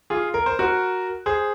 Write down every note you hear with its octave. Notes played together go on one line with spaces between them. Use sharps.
F4 G#4
A#4
C5
F#4 A#4
G#4 C5